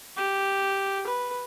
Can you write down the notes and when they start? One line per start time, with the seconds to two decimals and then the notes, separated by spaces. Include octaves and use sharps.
0.17 G4
1.06 B4